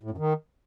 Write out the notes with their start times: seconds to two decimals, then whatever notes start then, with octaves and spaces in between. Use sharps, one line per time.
0.03 A2
0.11 F#2
0.18 D#3